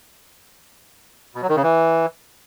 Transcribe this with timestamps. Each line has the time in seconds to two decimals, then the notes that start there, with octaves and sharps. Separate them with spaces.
1.35 B2
1.42 F#3
1.49 D#3
1.56 C#3
1.63 E3